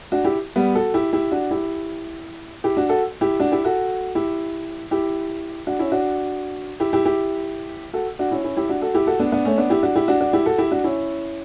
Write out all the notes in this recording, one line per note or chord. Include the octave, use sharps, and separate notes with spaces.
D4 F#4
E4 G4
G3 B3
F#4 A4
E4 G4
E4 G4
D4 F#4
E4 G4
E4 G4
D4 F#4
F#4 A4
E4 G4
D4 F#4
E4 G4
F#4 A4
E4 G4
E4 G4
D4 F#4
C#4 E4
D4 F#4
E4 G4
E4 G4
E4 G4
F#4 A4
D4 F#4
C#4 E4
C#4 E4
E4 G4
D4 F#4
F#4 A4
E4 G4
F#4 A4
B3 D4
B3 D4
A3 C#4
B3 D4
E4 G4
D4 F#4
E4 G4
D4 F#4
D4 F#4
E4 G4
F#4 A4
E4 G4
D4 F#4
C#4 E4